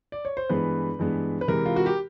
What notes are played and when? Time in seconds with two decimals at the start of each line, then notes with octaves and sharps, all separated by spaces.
0.12 D5
0.25 C#5
0.37 C5
0.49 G2 E3 G#3 B3 B4
0.99 G2 E3 G#3 B3
1.41 B4
1.48 C3 E3 G#3 A#4
1.66 F4
1.76 F#4
1.86 G4